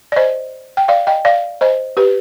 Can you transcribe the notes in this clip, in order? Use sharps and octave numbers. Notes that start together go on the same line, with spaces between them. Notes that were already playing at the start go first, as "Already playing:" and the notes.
D5
C5 D#5
G5
D5 F5
D#5 G5
D5 F5
C5 D#5
G4 B4